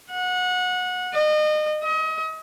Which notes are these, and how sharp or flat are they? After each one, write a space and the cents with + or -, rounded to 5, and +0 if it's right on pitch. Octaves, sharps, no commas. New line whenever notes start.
F#5 -25
D#5 -30
D#5 +35